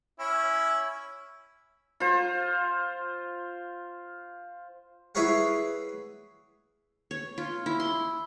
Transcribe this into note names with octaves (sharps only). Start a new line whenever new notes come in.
C#4 E4
F4 C5
E4 G#4 B4 C#5 F5 F#5
C#5
F4
E4
C6